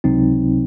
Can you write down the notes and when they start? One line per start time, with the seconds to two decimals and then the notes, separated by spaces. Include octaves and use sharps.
0.04 C#2 C3 F#3 C4 D#4